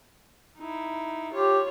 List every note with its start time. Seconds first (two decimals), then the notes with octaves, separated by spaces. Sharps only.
0.58 D#4 E4
1.33 F4 G4 C#5